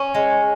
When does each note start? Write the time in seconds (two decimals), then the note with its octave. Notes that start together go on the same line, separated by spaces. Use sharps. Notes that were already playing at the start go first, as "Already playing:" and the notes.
Already playing: C#4
0.15 G#3